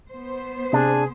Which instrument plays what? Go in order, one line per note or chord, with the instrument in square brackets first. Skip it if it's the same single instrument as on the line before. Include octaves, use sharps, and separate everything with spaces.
[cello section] B3 C5
[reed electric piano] C3 [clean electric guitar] D4 [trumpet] G#4